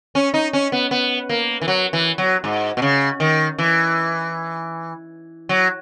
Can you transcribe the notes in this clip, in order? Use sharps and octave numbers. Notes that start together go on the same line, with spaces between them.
C#4
D#4
C#4
B3
B3
A#3
E3
F#3
E3
F#3
G#2
B2
C#3
D#3
E3
F#3